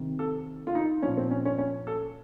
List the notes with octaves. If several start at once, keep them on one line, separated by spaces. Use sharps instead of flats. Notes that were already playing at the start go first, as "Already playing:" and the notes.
Already playing: C3 D#3
A4
F4
D#4
A#2 F3 C#4
C4
C#4
C#4
C#4
A4